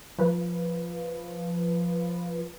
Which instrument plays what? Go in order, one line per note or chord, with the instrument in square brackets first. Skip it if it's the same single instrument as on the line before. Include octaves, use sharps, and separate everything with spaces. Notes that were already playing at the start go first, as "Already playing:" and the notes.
[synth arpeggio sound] F3 B4